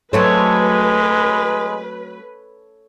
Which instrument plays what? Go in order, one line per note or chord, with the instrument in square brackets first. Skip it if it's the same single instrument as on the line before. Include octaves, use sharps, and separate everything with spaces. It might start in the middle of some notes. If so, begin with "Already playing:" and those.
[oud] F#3 A3 C4 [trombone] G#3 [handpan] A4 C#5 [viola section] B4